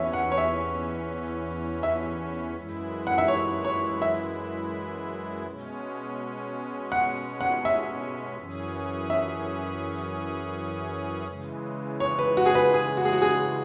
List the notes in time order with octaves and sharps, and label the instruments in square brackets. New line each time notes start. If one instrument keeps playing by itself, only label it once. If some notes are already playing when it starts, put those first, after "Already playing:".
Already playing: [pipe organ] E2 E3 C#4 [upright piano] C#5 E5
[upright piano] F#5
C#5
E5
E5
[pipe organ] F#2 E3 G#3 E4
[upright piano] F#5
E5
C#5
C#5
E5
[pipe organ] B2 G#3 C#4
[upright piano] F#5
F#5
E5
[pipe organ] F#2 E3 C#4 G#4
[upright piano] E5
[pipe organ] C#3 E3 G#3
[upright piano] C#5
B4
F#4
G#4
B4
G#4
F#4
G#4
F#4
G#4